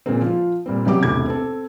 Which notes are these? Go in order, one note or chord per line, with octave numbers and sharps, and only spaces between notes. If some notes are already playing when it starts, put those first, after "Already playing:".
A#2 C#3 G#3 A#3 C4
F3 F4
A#2 G3 C4
A1 C3 F#3 G4 D6
E1 C2 A2 C3 D6 G#6
C4 A4